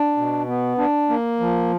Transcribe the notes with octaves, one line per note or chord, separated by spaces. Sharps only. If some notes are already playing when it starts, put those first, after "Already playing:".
Already playing: D4
B2
B3
D4
A#3
F3